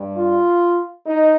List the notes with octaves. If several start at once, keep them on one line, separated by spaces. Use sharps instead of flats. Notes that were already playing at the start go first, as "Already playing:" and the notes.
Already playing: G2 G3
F4
D#4